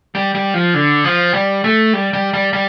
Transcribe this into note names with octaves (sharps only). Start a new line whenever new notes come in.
G3
G3
F3
D3
F3
G3
A3
G3
G3
G3
G3